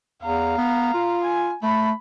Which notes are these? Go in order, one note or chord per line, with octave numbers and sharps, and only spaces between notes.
E2 F5 A#5
B3
F4
G#5
A3 B5